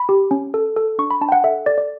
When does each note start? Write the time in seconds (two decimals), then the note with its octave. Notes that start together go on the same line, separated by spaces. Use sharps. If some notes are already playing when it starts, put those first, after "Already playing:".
Already playing: B5
0.09 G4
0.31 C#4
0.54 A4
0.77 A4
0.99 D4 C#6
1.11 B5
1.21 D4 A5
1.29 G5
1.32 F#5
1.44 A4 E5
1.66 A4 D5
1.78 D5